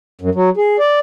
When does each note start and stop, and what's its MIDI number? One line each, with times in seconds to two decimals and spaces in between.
0.21 0.30 42
0.35 0.49 54
0.57 0.77 68
0.79 0.99 74